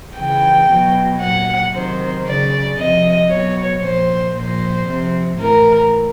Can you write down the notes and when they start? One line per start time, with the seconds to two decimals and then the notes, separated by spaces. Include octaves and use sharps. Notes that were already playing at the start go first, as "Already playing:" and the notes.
0.18 C#3 E3 G5
0.70 B2 F#3
1.21 A#2 F#3 F#5
1.74 C3 D#3 F#3 C5
2.26 C#3 F#3 D5
2.78 C3 F3 D#5
3.30 B2 F#3 C#5
3.82 A#2 F3 C5
4.34 A#2 F3 C5
4.87 C3 F3
5.39 A2 E3 A#4